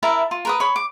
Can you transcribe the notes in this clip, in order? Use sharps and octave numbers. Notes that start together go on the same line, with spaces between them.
E4 A#4 E5 A5
F4
A#4 B4 D#6
C#5 B5
D6